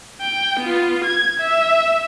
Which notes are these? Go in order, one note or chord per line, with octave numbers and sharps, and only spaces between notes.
G5
B3 F4
G#6
E5